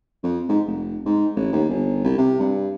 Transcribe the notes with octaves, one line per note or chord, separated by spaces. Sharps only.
F2
G#2
F1
G#2
A1
D#2
G1
C2
C3
G2